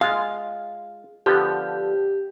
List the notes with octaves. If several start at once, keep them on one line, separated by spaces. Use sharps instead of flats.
G#3 F4 F5
D3 F3 B3 G4